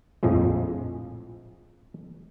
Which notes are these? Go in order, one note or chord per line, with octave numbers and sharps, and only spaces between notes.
A#1 F2 A2 F3 G#3